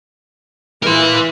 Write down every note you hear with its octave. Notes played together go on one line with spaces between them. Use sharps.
E3 A#4 C6